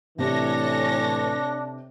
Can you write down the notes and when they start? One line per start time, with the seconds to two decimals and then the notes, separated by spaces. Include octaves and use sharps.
0.19 A2 C3 E3 D4 A4 C#5 A#6